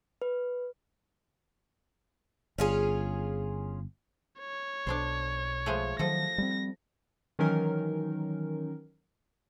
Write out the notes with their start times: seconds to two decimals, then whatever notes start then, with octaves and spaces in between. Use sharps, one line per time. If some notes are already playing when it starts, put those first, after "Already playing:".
0.22 B4
2.58 G1 C#4 F4 G#4
4.40 C#5
4.87 B1 D4 A4 C5
5.66 F3 G#3 A3
5.99 D#3 F3 F#3 A4 A#6
6.38 G3 A3 C4
7.39 D#3 E3 F#3 C#4 D#4 A#4